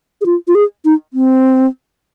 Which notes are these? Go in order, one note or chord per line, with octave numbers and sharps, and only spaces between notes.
G#4
F4
F4
G#4
D#4
C4